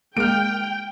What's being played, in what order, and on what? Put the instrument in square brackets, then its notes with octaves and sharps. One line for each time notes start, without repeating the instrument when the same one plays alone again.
[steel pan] G#3 A#3 [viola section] G5 [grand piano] F6 D7